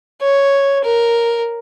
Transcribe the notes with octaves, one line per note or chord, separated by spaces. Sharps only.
C#5
A#4